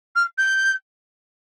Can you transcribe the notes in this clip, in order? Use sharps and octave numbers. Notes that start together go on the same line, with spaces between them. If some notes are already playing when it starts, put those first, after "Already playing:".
F6
G6